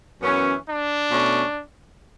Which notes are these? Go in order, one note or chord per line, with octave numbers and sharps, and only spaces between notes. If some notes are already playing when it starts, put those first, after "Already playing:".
F#2 E3 B3 C#4
D4
B2 A3 C#4